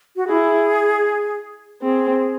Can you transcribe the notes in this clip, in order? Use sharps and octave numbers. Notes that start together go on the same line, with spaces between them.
F#4
E4 G#4
C4 G#4